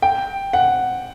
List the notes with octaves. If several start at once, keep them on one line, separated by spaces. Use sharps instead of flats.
G5
F#5